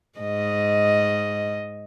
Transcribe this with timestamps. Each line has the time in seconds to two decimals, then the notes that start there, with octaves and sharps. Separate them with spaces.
0.19 G#2 D#5